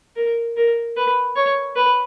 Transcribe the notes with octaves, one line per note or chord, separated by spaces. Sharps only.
A#4
A#4
B4
C#5
B4